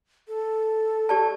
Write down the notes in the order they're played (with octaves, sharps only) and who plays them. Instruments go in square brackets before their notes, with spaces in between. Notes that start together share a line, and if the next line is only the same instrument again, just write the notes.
[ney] A4
[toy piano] G4 D5 A5